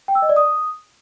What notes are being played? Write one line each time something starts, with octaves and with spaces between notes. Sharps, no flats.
G5
E6
D#5
D5
D#6